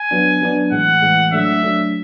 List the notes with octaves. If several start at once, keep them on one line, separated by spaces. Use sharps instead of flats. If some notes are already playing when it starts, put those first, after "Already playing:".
Already playing: G#5
F#3 B3 D4
F#3 B3 D4
A2 E3 G#3 F#5
A2 E3 G#3
F#3 A3 D4 E5
F#3 A3 D4